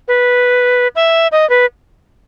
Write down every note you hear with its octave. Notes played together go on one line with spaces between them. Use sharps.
B4
E5
D#5
B4